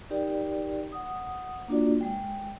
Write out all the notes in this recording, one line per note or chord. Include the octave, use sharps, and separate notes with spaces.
D#4 G4 A#4 D5 G5
F#5 D#6
A#3 D4 F4 F#4 D5
G#3 G5